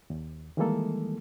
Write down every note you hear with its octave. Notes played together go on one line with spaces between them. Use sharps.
D#2
D#3 E3 G3 G#3 A#3 A4